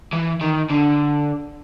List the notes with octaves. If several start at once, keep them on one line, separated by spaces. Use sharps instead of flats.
E3
D#3
D3